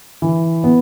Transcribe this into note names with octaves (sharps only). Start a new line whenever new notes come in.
E3
B3